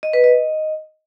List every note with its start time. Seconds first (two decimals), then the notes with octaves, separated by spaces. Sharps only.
0.03 D#5
0.13 B4
0.24 D#5